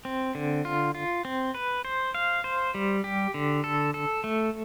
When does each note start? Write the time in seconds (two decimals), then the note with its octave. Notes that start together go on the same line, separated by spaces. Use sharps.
0.05 C4
0.35 D3
0.65 F4
0.95 F4
1.25 C4
1.55 B4
1.85 C5
2.15 F5
2.44 C5
2.75 G3
3.04 G4
3.34 D3
3.64 A4
3.94 A4
4.24 A3